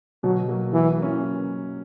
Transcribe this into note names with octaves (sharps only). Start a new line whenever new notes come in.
B2 F#3
F#3 A#3
E3 F#3
A#3 C#4